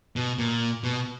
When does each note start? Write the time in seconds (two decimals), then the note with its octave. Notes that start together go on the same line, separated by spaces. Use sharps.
0.16 B2
0.38 A#2
0.84 B2